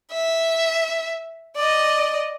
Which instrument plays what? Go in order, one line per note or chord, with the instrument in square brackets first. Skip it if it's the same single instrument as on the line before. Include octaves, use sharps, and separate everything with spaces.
[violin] E5
D5 D#5